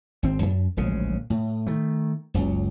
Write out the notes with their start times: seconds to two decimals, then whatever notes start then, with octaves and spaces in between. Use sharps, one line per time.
0.23 G#1 C4
0.42 F#2
0.77 D1 A#1 C#3 G#3
1.30 A2
1.67 D#3 A3
2.34 F#1 C#2